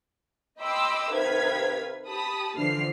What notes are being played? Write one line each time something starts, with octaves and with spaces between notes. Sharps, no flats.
D#5 G5 B5 C6 D6 E6
C3 D#3 B4 F5 G#6 B6
G4 A5 B5 D#6
D3 E3 F3 F6 C7